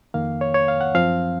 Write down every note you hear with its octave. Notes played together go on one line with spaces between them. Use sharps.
F2 D#3 A#3 F5
C#5
C#5
F5
F#5
F#2 F3 C4 F5